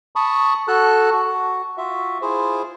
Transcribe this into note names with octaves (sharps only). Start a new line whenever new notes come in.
A5 B5 C#6 D#6
F#4 A4 A5 F#6
F#4
F4 F#4 E5
E4 F4 G#4 C5